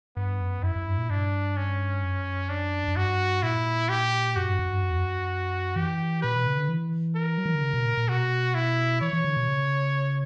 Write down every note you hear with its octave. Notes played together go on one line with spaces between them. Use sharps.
G2 B3
F#2
F#2 E4
F#2
G2
A#2
G2 D4
C#4
F#2
D4
F#2
G2 F#4
A#2 E4
G4
F#2 F#4
G2
F#2
G2
F#2
E2
F#2
E3 G4
A#2 B4
B2
C#3
D3
E3
A#4
F#3
E3
D3
C#3
B2
A#2
A#2
B2 F#4
E4
E3 C#5
E3
D3
B2
C#3